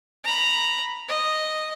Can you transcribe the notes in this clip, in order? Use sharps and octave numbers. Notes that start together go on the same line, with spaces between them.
A#5 B5
D#5